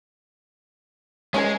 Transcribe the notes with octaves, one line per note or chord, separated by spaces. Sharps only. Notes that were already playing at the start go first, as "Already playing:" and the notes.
G#3 C#4 A#4 G#5